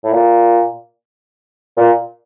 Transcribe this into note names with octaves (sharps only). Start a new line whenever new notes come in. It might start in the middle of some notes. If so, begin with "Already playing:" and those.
A2
A#2
A#2